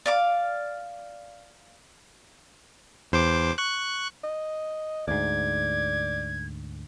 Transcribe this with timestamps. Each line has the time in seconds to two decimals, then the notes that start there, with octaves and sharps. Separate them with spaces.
0.06 D5 F5 D6
3.12 E2 C5 D6
3.58 C#6 F#6
4.24 D#5
5.08 D2 G#2 D5 G#6